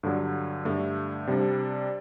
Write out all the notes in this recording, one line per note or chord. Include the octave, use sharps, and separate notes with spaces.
G2 D3 F#3
G2 D3 A3
C3 G3 D4